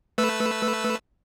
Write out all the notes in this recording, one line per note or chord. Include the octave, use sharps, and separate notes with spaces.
A3 B4 E6